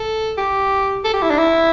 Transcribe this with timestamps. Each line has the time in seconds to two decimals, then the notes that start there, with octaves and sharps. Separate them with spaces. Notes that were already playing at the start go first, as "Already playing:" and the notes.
Already playing: A4
0.38 G4
1.05 A4
1.14 G4
1.22 E4
1.31 D4
1.39 E4